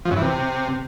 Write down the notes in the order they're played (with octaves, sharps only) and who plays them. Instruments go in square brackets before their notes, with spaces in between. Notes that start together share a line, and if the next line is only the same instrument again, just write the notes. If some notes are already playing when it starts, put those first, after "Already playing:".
[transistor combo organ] F3
F#2
E3
C3